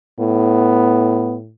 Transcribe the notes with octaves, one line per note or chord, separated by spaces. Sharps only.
A2 B3